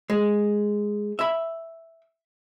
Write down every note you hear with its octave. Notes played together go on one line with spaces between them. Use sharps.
G#3
E5 B5